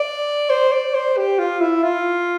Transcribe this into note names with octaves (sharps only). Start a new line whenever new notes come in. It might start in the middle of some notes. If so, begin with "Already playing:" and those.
Already playing: D5
C5
D5
C5
G4
F4
E4
F4